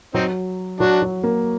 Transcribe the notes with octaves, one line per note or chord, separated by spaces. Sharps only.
F#3 C4 D#4
F#3 D4 F#4
F#3
A#3